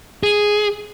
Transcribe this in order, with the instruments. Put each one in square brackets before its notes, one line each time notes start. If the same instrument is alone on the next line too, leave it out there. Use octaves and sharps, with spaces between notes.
[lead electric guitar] G#4